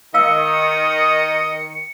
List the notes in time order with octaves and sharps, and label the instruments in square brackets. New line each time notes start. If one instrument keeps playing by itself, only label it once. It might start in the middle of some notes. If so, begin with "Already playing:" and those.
[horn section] D#3 [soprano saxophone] D#5 [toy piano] F5 E6 [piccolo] C#7